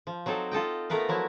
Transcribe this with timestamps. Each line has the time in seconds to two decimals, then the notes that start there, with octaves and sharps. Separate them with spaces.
0.07 F3
0.26 F#3 C4 D#4 A4
0.51 F4 A4 D#5 G5
0.90 A3 B3 A#4 B4 F5
1.09 F3 F#3 E4